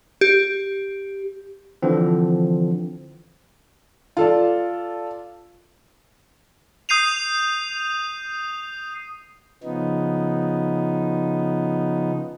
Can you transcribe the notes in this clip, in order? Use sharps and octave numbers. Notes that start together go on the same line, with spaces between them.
G4
D3 E3 F3 C4
F4 A4 D5
D#6 G6 C7 D#7 F7
C#3 F3 B3 D#4